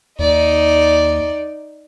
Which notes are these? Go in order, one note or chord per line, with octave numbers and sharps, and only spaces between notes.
D#2 D#4 D5